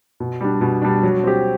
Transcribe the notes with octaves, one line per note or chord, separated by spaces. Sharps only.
B2
G3 D4
B2
G3 D4
F#3
C4 G4